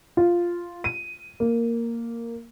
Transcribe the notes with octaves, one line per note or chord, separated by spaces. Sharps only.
F4
D#7
A#3